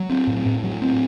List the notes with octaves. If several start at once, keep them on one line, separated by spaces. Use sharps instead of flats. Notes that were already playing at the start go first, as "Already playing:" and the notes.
Already playing: F#3
C4
A2
A2
F#3
C4